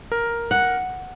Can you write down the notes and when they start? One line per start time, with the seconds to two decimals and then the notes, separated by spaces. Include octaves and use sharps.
0.12 A#4
0.51 F#5